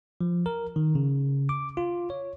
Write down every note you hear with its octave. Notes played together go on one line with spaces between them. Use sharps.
F3
A#4
D#3
C#3
D6
F4
C#5